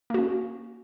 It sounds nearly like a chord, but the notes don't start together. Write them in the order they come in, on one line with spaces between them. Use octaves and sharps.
A#3 F#4 C#4